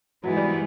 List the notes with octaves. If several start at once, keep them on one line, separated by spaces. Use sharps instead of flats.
G#2 E3 F#3 G#3 B3 E4
G3